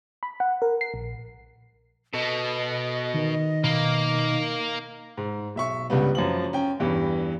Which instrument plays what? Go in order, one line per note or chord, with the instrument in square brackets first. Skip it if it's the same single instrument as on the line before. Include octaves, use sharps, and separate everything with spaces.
[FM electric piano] B5
F#5
A#4
C7
A#1
[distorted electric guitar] B2 [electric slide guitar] A4 [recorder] D#5
[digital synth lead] D#3
[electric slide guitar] B2 [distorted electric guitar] A#3
[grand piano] G#2
B1 E5 C#6
C#2 G2 G3 B3
F#2 F3 F#7
C#4 G5
E2 G2 E3